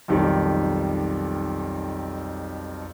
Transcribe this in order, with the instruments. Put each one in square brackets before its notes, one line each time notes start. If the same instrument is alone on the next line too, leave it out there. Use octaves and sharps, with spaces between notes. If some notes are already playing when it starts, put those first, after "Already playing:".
[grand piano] B1 F2 D#3 G3